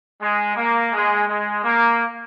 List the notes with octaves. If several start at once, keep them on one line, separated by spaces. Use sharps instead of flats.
G#3
A#3
G#3
G#3
A#3